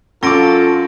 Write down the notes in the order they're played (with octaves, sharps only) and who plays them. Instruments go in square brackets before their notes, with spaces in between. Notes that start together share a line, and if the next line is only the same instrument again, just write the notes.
[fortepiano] F#2 D6 [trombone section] F4 [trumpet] A4 [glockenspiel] C#6 A#6 D7